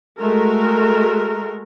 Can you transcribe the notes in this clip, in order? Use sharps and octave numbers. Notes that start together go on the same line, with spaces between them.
G#3 A3 F#4 A#4